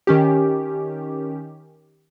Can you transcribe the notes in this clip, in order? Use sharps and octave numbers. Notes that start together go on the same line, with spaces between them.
D#3 C#4 G4